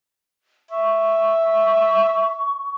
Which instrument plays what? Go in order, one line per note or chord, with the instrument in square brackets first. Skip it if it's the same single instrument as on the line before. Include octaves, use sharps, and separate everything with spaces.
[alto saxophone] E5 [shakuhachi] C#6